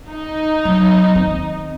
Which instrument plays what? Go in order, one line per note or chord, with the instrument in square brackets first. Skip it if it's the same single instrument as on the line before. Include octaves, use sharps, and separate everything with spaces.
[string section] D#4
[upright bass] F#3
D#3 C4